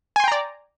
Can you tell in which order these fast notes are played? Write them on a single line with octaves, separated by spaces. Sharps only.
G#5 C6 G5 A#5 D5